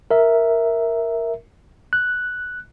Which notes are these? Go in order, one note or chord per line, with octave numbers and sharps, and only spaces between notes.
A#4 E5
F#6